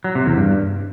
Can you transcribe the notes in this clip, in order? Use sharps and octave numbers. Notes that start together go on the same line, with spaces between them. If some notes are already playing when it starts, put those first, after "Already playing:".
F#3
C3
E2
G2